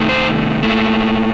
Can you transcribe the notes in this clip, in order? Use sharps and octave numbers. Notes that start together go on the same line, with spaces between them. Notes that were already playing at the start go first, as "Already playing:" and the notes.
Already playing: C3 D#3 A3
C5
A#2 A3